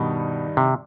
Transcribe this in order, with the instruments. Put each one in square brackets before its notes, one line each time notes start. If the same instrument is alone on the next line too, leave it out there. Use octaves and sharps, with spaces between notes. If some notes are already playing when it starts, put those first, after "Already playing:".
Already playing: [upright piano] G2 D#3 G3 D#4 [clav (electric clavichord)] B2
[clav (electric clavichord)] C3